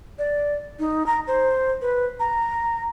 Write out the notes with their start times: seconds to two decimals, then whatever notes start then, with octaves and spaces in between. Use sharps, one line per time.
0.19 D5
0.79 D#4
1.06 A#5
1.27 C5
1.82 B4
2.20 A#5